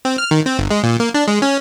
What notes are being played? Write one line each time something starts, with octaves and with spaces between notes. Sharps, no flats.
C4
F6
D#3
C4
G1
G#3
A#2
A#3
D4
G#3
C#4